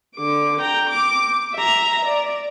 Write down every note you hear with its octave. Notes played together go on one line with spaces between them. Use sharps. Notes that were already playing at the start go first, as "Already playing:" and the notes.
D3 D6
G5 A#5
D6
E5 A#5
D5